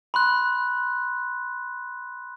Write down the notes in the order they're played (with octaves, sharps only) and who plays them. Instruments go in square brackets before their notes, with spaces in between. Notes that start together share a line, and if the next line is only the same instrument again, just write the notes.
[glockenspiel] B5 C6 F#6